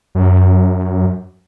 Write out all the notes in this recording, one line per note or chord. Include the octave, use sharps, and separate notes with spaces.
F#2